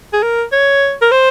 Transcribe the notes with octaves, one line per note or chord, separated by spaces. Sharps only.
G#4
A#4
C#5
A#4
C5